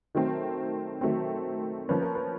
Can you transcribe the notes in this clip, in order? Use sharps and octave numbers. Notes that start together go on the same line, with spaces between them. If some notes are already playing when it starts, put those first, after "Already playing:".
D#3 F#3 A3 C4
D#3 F#3 A3 C4
F3 A#3 C#4 B4
A#4
B4